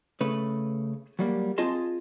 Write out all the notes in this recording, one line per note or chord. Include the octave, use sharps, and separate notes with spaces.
C#3 A3 B4
F#3 G3 A#3
C4 F4 G#4 D#5 A5 C6